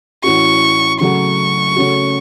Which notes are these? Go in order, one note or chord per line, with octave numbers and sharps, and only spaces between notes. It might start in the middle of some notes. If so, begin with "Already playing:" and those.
A2 E3 C#4 F#4 C#6
C#3 F#3 A3 F#4 C#6
C#3 A3 C#4 F#4